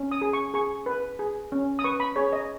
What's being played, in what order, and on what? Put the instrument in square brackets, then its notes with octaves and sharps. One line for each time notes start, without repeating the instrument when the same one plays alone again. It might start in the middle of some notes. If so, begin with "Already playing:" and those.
Already playing: [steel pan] C#4
D#6
G#4
C#6
G#4 C#6
B4
G#4
C#4
D#6
B4 C#6
B5
G#4 C#5
D#5